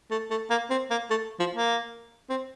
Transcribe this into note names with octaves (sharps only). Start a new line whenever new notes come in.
A3
A3
A#3
C4
A#3
A3
F3
A#3
C4